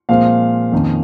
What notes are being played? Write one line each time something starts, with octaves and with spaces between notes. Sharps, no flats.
A#2 F3 G#3 C4 F5
F2 D#3 A#3 C#4